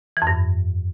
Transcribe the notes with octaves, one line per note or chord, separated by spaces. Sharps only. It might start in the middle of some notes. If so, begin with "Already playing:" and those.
E3
F2
G2